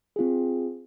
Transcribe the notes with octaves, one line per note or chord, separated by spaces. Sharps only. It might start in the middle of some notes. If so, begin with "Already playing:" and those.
C4 F4 G#4